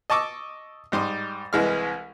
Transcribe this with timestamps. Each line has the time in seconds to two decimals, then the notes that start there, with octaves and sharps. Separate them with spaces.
0.10 D#5 A5 C#6 D6 E6
0.92 G#2 G3 C6 D#6
1.53 C2 E3 G#3 G#4 F6